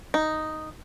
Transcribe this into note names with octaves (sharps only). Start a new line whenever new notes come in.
D#4